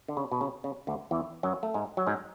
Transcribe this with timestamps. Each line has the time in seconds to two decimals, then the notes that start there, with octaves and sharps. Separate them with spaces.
0.08 D3
0.17 C#3
0.31 B2
0.41 C#3
0.64 C#3
0.87 D2 D3
1.11 E2 E3
1.43 F#2 F#3
1.63 A3
1.74 G#2 G#3
1.97 F#3
2.07 G#2 G#3